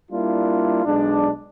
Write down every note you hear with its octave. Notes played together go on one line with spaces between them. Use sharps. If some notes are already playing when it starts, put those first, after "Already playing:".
G3 A#3 D4 E4 F4
B1 G#3 D4